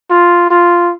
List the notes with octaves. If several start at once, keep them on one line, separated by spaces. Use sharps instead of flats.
F4
F4